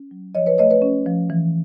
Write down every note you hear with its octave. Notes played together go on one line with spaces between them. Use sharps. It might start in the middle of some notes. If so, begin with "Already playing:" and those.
Already playing: C#4
F#3
F3 C#5 D#5
B4 C#5
A3 C#5 D#5
B4 C#5
C#4
F3
E3